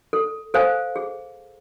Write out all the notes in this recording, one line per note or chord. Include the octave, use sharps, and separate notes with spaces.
A4
A4 C5 F5 G#5
G#4